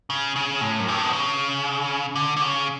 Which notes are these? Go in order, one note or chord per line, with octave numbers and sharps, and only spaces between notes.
C#3
C#3
A2
F#2
G2
A2
B2
C#3
D3
D3
C#3